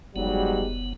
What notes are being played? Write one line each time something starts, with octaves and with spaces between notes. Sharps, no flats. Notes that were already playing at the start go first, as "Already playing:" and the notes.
F#1 G#2 F#3 G3 B3